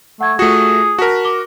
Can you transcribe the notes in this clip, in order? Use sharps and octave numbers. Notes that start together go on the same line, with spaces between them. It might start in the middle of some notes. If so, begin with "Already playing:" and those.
A3 F#5 G#6
A3 F4 F#4 G#4 C#7
F#4 A#4 A5 B6
D6 G7